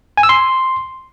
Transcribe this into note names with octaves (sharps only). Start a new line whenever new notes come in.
G#5
E6
C6